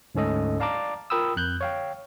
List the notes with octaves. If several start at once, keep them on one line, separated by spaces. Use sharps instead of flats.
D2 G#2 C#4 A4 D#5
D5 F5 A5 A#5 D6
F4 A#4 G5 B5 D#6 E6
F2 F#6 G6
C#5 F5 G5